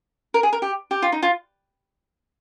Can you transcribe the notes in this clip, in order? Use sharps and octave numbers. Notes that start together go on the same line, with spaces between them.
A#4
G#4
A#4
G4
G4
F4
D#4
F4